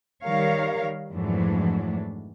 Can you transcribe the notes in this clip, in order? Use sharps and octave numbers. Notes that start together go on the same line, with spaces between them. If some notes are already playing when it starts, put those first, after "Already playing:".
D#3 G3 A#4 C#5 F5
F2 G#2 E3 F#3 A3 D4